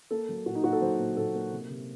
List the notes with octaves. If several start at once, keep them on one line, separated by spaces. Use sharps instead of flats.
A#3 A4
F#3
A#2 F#4
D#4
A#2 F#4
A4
F#3 C5
A#2
A#2 A4
A#3
C3
C3